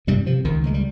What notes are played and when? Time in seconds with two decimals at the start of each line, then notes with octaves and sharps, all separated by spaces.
0.07 G2 C3 G3
0.26 C3 F3
0.45 C#2 D#3
0.64 C#2 G#3
0.74 G3